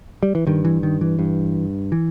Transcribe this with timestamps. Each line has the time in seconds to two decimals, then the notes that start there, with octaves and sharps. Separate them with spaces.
0.23 G3
0.35 E3
0.47 G2 D#3
0.65 E3
0.83 D#3
1.01 E3
1.19 G2
1.92 E3